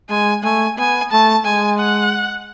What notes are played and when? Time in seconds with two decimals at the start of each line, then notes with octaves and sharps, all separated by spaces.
0.10 G#3 G#5
0.43 A3 G#5
0.78 B3 G#5
1.12 A3 A5
1.45 G#3 G#5
1.79 F#5